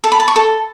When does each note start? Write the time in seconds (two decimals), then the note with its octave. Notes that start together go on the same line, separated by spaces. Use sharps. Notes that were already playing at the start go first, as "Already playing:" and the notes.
0.04 A4
0.12 B5
0.20 A5
0.28 C#6
0.36 A4